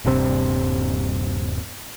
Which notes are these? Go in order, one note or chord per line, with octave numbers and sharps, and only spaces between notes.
D#1 G2 C3 C4